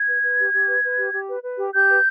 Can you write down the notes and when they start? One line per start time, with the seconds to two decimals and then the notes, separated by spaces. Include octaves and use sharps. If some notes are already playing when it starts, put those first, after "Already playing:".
Already playing: G#6
0.08 B4
0.23 B4
0.38 G4
0.53 G4
0.68 B4
0.84 B4
0.98 G4
1.13 G4
1.28 B4
1.44 B4
1.59 G4
1.74 G4 G6
1.89 B4